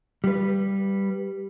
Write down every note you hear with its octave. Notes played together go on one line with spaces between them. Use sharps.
G3 B4